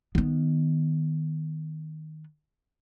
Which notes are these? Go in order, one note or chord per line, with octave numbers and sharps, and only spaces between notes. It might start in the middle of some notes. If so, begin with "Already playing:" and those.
D#3 B3